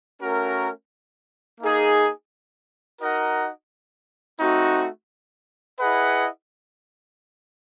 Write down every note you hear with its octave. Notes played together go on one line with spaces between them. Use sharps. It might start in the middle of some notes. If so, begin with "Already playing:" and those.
A3 C#4 F#4 A#4
A#3 D#4 G#4
D#4 F#4 A#4 D#5 F#5
A3 C4 D#4 F#4
E4 G#4 B4 D#5 F#5